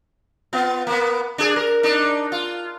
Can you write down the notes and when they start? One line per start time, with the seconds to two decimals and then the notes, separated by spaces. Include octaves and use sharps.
0.53 B3 F4
0.87 A#3 B3
1.38 D4 G#4
1.56 A#4
1.83 D4 D#4
2.32 F4